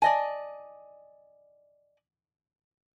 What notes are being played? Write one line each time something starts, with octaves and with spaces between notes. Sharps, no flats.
D5 D#5 G#5 A5